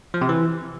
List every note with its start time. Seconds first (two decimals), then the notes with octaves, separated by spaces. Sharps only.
0.14 F3
0.22 C3
0.29 E3